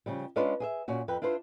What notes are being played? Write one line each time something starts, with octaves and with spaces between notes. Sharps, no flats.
C#3 F3 G3
G#3 C#4 D4 F4 B4 D5
G#4 D#5 E5
A#2 C#4 F#4
F2 B4 G5
D4 E4 F4 B4 C5